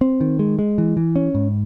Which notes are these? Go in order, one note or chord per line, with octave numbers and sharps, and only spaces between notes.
C4
D#3
G#3
G#3
E3
E3
C#4
G#2